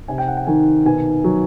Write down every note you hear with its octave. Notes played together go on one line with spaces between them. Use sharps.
C3 G#5
G5
F#5
G5
D#3 G#5
B2 G#5
F#3